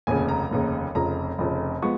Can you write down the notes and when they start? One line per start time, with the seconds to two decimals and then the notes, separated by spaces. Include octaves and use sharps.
0.07 F1 D#2 C#3 G#5
0.28 A#5
0.51 F1 D#2 C#3
0.95 F1 F2 C#3 A#5
1.38 F1 F2 C#3
1.82 F3 G#3 B3 C#6